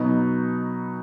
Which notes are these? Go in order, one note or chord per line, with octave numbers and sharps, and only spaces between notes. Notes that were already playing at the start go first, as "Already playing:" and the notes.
Already playing: B2 F#3 B3 D#4